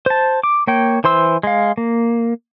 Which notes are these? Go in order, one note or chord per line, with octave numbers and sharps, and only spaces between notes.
C5 A5
D6
A#3 C#5 G5
E3 C5 C6 E6
G#3 F5
A#3